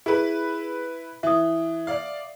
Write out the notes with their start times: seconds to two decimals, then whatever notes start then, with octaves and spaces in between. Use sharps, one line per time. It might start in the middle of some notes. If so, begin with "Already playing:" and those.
0.06 E4 G#4 B4
1.23 E3 E5 D#6
1.87 D5 F5